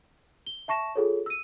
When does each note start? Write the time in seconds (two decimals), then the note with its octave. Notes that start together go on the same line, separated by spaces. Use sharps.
0.46 G7
0.68 E5 A5 C#6 A#6 E7
0.95 F4 G#4 A4 C#5
1.26 E6 D#7